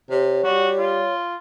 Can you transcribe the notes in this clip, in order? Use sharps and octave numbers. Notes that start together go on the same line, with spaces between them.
C3 C#5
G3 F#4
F4